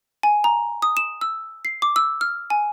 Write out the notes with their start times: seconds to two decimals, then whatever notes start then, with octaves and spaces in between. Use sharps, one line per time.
0.23 G#5
0.44 A#5
0.82 D#6
0.97 E7
1.21 E6
1.65 C7
1.82 D6
1.96 E6
2.21 F6
2.50 G#5